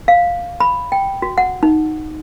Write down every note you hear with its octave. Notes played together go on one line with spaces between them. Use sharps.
F5
B5
G5
F#4
F#5
D#4